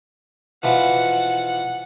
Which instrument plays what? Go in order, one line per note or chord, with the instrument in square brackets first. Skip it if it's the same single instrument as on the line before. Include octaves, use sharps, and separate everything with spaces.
[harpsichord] B2 E3 F3 [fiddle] F#5